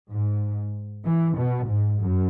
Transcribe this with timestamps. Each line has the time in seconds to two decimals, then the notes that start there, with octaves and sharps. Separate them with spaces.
0.10 G#2
1.05 E3
1.37 B2
1.68 G#2
1.99 F#2